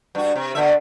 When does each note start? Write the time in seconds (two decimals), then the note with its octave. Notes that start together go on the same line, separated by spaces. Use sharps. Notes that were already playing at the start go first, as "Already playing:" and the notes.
0.15 G2 F#4
0.36 C3
0.55 B2 D3 E5